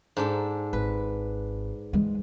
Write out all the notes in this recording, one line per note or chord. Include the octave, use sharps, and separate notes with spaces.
G#2 D4 A4
G#1 B4
E3 G#3